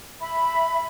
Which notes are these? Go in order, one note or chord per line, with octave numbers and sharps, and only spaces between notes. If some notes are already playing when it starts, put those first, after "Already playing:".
E5 B5